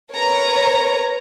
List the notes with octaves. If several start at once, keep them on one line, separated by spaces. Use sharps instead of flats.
A#4 B4 C#5 A#5